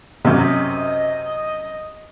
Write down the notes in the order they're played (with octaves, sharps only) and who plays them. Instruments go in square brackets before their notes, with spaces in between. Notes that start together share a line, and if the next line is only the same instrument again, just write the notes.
[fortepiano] F#2 C3 [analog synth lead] D#5